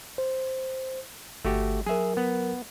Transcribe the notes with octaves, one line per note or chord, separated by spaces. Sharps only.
C5
G1 A3 F#4 G4
F#3 G#4 A#4 E5
B3